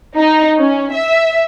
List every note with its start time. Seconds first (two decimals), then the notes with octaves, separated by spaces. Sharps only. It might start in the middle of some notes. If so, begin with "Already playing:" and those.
0.16 D#4
0.57 C#4
0.92 E5